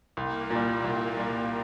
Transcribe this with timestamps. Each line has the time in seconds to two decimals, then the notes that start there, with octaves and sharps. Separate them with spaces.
0.17 C2 A#3
0.50 A#2 G3
0.84 C2
1.17 A#2 G3